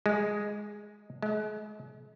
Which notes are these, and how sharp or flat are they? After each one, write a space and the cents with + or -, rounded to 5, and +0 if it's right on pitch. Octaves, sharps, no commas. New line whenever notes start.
G#3 +0
G#3 +40